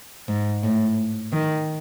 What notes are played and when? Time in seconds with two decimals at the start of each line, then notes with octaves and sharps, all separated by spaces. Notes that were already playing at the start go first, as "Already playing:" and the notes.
0.28 G#2
0.63 A2
1.33 D#3